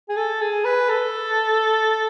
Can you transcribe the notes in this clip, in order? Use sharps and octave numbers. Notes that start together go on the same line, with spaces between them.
G#4
A4
G#4
B4
A4